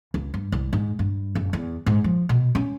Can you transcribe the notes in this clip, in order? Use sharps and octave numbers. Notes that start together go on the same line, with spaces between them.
C#2
G2
C2
G#2
G2
F#1
E2
G#2
F3
B2
C#4